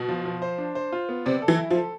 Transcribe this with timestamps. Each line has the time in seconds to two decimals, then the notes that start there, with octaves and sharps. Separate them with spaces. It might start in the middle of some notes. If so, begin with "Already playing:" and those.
Already playing: B2
0.09 F3
0.25 F3
0.42 C5
0.58 D4
0.75 C5
0.92 F4
1.09 B3
1.26 C3 D5
1.42 A4
1.48 E3
1.59 E4
1.71 F3
1.76 A4